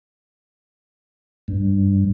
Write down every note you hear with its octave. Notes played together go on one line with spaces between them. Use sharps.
G2